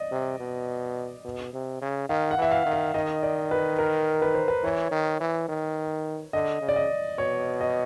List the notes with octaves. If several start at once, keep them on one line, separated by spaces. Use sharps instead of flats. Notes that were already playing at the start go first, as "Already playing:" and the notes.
Already playing: D5 D#5
C3
B2
B2
C3
C#3
D#3 F5
F#5
E3 E5
F5
D#3
F5
D#3 D#5
D5
B4
A#4
B4
C5
B4
E3 C#5
D#3
E3
D#3
D3 D#5
C#3
D5
D#5
B2 C#5
D#5